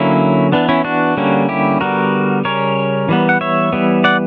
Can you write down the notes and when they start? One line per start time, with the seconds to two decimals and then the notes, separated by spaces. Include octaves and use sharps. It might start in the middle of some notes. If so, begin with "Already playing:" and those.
Already playing: D3 F#3 A#3 C#4 E4
0.52 E3 B3 D4
0.69 C#4 E4
0.84 D4 F#4
1.17 D3 G3 A#3 C#4
1.49 E4 G4
1.80 D3 G3 B3 F#4 A#4
2.45 C#3 G3 C#4 A#4 C#5
3.09 E3 G3 B3
3.29 F#5
3.41 C#5 E5
3.73 E3 G3 B3
4.04 D5 F#5